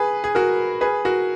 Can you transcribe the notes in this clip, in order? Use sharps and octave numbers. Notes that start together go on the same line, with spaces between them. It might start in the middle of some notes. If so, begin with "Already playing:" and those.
Already playing: G#4 B4
G#4
F#4 A#4
G#4 B4
F#4 A#4